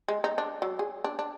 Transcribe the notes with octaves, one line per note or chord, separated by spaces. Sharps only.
G#3
D#4
D4
F#3
G#4
D4
D4